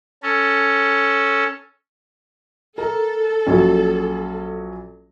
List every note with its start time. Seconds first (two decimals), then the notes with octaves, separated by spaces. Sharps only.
0.23 C#4 A4
2.78 A4 A#4
3.47 A#1 F#3 C#4